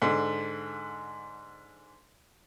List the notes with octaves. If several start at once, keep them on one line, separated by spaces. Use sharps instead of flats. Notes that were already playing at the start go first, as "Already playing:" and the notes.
G#2 D3